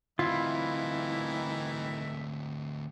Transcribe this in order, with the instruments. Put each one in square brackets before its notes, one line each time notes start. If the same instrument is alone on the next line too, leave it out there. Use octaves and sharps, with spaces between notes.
[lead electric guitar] D2 C4 [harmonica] D#3 E3 E5 [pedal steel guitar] E4 [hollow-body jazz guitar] F4